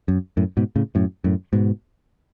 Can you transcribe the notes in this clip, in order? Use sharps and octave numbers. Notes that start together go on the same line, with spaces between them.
F#2
F#2 A2
G#2 B2
A2 C#3
F#2 A2
F#2 A2
G#2 B2